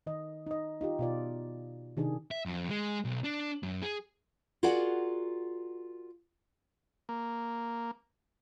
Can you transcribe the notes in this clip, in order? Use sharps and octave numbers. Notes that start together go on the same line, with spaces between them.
D#3 D#5
D#4 D#5
D#4 F4 G4
B2 F4 D5
C3 D#3 D4 G#4
E5
F2
G#3
B1
D4
F#2
G#4
F4 F#4 G#4 A#4 D5 F#5
A#3